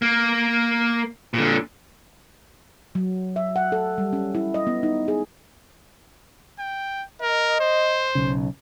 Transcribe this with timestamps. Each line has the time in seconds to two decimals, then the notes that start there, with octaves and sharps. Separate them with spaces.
0.02 A#3
1.34 A#2 D3
2.95 F#3
3.36 E5
3.56 F#5
3.72 A4
3.98 G3
4.13 C#4
4.35 E4
4.54 D#5
4.67 B3
4.83 D#4
5.08 G#4
6.59 G5
7.21 A#4 D#5
7.60 C5
8.15 B1 C#3